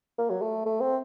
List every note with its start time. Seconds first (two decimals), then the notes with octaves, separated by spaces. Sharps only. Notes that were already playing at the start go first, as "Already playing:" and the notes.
0.18 A#3
0.30 F#3
0.42 A3
0.66 A3
0.80 C4